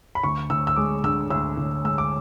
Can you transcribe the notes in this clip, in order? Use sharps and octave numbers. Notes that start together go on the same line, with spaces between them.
B5
D2 C#6
D2 E6
E6
G#3 D6
D3 E6
D2 E6
D2
G#3 E6
D6